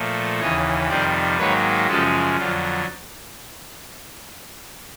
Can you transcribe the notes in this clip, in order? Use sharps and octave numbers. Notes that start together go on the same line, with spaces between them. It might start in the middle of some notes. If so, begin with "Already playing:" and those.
Already playing: A#2 F3 A3
D#2 C#3 E3 C#5 D#5
F2 C3 D#3 G3 C5 D5
G#2 D#3 F#3 A#3 B4 C#5
F#2 C#3 F3 G#3 G4 A4
F2 D3 F#3 F4